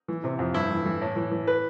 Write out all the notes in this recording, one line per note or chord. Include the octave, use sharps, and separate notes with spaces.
E3
C3
F2
G2 E4
E3
E3
A2
E3
E3
B4